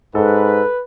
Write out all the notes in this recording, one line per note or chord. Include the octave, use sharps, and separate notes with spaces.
G#2 A4 B4